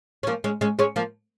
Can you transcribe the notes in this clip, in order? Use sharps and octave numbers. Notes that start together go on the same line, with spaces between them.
C#4
F3 A#3
G#3 C#4
G#3 C#4
G#3 C#4
F3 A#3